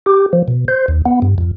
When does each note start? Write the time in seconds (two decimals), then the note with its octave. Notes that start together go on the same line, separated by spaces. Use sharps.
0.06 G4
0.33 F3
0.48 B2
0.68 C5
0.88 D#2
1.06 B3
1.22 G2
1.38 F2